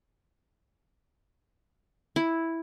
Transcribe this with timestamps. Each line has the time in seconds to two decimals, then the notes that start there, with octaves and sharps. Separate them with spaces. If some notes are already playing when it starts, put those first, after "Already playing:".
2.16 E4